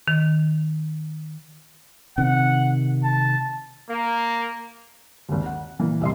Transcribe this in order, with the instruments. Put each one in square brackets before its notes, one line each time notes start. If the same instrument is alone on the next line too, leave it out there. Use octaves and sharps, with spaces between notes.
[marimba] D#3
[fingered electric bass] C3 D#3 [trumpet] F#5
[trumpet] A5
[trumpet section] A#3
[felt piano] G#1 D#2
F#5
A#2 E3 A#3
C2 E5 C6